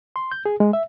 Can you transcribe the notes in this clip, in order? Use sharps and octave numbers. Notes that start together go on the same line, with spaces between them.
C6
G6
G#4
G#3
E5